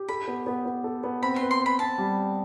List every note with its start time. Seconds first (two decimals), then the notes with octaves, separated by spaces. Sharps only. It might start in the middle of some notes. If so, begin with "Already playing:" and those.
Already playing: G4
0.08 A4 B5
0.27 B3
0.46 B3
0.66 B3
0.84 A4
1.04 B3
1.22 C4 B5
1.36 C6
1.42 B4
1.51 C6
1.61 B4 B5
1.79 C4 A5
1.98 G3